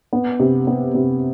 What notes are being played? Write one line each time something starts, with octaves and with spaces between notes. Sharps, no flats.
B3
C3
B3
C3